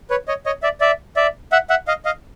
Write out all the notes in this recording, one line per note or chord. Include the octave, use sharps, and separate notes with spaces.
B4 C#5
C#5 D#5
C#5 D#5
D5 E5
D5 E5
D5 E5
E5 F#5
E5 F#5
D#5 F5
D#5 F5